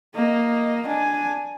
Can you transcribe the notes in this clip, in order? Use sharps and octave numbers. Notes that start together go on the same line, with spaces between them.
A#3 D#5
D4 G#5